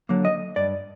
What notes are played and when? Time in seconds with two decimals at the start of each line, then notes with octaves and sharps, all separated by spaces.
0.09 D3 F#3 A#3
0.25 D#5
0.56 G2 D5